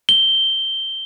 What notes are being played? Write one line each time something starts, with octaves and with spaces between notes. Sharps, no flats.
G7